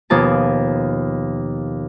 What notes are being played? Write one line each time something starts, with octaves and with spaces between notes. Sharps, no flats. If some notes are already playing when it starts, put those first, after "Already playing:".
D#2 B2 F3 G#5 A5